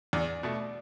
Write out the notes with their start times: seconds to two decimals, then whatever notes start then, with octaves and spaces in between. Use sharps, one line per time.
0.13 E2 D5
0.43 B2 A3